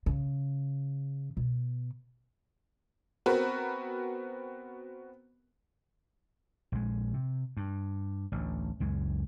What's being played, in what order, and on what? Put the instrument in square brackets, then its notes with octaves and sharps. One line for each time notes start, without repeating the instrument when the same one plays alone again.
[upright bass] C#3
B2
[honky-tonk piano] B3 C4 F#4 A#4 B4
[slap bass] A#1 G#3
C3
G2
A1 D2
C#2 F#2 G#3